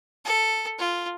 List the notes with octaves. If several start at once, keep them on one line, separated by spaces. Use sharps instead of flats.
A4
F4